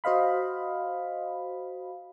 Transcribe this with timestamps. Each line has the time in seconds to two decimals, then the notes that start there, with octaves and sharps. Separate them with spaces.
0.04 F#4 C5 D#5 F5 B5